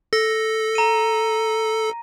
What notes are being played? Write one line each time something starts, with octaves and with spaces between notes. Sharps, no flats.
A4 A#6
A#5 D#7